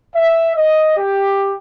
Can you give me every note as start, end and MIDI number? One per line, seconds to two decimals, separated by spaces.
0.16 0.50 76
0.55 0.96 75
0.97 1.55 67